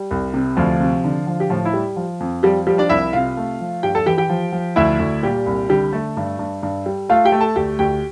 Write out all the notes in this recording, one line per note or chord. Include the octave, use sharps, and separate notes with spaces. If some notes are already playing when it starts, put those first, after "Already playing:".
Already playing: G3
C2
C3
D2 F3 F4
C3
D3
F3
G4
A2 F3 F4
E4
G3
F3
F2
F3 G3 G4
F3 G3 G4
D4 D5
C2 E4 E5
C3 F4 F5
A3
F3
G2 G4 G5
A4 A5
E3 G4 G5
G4 G5
F3
F3
D2 E4 E5
D2
A#2 G3 G4
C2
D3 G3 G4
A3 A4
G2
G2
G2
G3
A3 F4 F5
G4 G5
A3
A4 A5
D2 G4 G5
D2 G4 G5